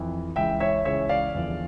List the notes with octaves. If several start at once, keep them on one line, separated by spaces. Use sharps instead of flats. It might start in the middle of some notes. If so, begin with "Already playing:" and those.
Already playing: F2 E3
C#2 C#3 E3 E5 G5
C#5 E5
C#2 C#3 E3 C#5 E5
D5 F5
E2 D3 F3